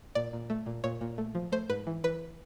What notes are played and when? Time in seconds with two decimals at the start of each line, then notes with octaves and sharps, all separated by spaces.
0.15 A#2 D5
0.33 A#2
0.50 A3
0.66 A#2
0.84 A#2 C#5
1.01 A#2
1.18 A3
1.35 F3
1.52 A3 C5
1.69 G#2 B4
1.87 E3
2.04 E3 B4